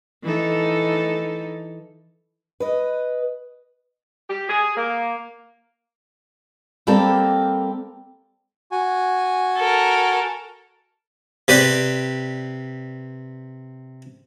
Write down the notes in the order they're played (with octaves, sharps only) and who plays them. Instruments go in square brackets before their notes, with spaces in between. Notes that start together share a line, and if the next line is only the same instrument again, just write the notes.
[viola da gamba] E3 D#4 A4
[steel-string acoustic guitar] B4 D#5
[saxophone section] G4
G#4
A#3
[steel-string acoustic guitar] G3 A#3 C4 G4 A4 A#4
[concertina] F#4 G#5
[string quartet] A4 A#4
[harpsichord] C3 G4 B4 D5